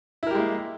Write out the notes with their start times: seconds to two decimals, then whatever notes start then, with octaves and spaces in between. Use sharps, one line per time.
0.23 E4
0.27 A#4
0.31 G4
0.35 G#3
0.39 A#3